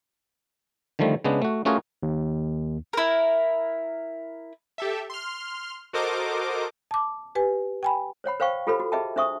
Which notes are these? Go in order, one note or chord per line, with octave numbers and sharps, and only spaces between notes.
D3 D#3 F3 G3 A3
C#3 G#3 B3 D4
A3 F#4
A3 C#4 F4 F#4 G#4 A#4
D#2
E4 A#4
G4 A4 E5
C6 F6
F#4 A4 A#4 C5 D#5 D6
A5 D6
G4 B4 G#5
G5 G#5 B5
C5 C#5 F#5 B5
B4 C5 F5 G5 C#6
F4 G4 A4 B4 C5 B5
F#4
G#4 B4 D#5 E5 G5 A5
D4 C5 E5 C#6 D#6